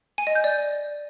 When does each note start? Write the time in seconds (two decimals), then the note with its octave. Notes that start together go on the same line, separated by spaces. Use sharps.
0.18 G#5
0.27 D#5
0.35 G6
0.44 D5